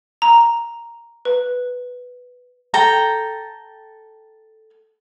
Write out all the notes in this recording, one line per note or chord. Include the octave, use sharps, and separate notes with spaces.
A#5
B4
A4 G5 A#5